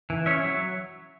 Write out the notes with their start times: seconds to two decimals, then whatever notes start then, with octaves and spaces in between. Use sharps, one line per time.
0.10 E3
0.26 C#4 C#5 E5
0.44 F#3